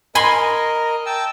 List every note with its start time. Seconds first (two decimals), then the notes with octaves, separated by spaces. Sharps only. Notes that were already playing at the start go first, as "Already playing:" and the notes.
0.15 A#4 D#5 G#5 B5 C6
1.06 G5 A5 E6